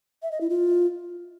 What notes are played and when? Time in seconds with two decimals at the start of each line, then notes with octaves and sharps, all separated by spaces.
0.23 E5
0.32 D#5
0.41 E4
0.50 F4